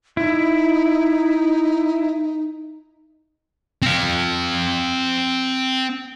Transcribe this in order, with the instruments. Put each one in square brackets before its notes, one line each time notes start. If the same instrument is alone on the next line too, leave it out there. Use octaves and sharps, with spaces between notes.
[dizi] D#4 [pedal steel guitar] E4
[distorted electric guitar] C4 F5